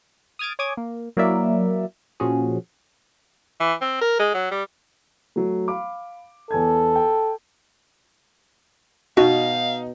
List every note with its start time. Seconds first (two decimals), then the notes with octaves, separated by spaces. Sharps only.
0.39 D#6 F6 G#6 A6 D7
0.59 C#5 G#5 D6 D#6 G#6
0.77 A#3
1.17 F#3 A#3 E4 A#4 D5 E5
2.20 A#2 F3 C#4 F#4 G#4
3.60 E3
3.82 C4
4.01 A#4
4.20 G#3
4.34 F#3
4.51 G3
5.36 F#3 A3
5.68 F5 B5 D6
6.51 E2 A4 G#5 G#6
6.96 G5
9.17 B2 D#4 F#4 F5